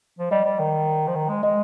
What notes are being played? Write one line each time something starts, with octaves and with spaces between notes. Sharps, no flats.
F3
G3 D#5
G3
D#3
F3
D#3
G#3
G#3 D#5